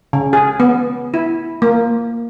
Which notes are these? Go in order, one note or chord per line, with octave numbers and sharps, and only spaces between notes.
C#3
G#4
B3
E4
A#3